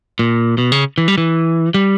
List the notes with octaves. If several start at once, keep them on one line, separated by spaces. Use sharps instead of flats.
A#2
B2
C#3
E3
G3
E3
G3